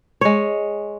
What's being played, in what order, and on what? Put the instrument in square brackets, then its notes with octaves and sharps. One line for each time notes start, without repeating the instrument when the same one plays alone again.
[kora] G#3 C#5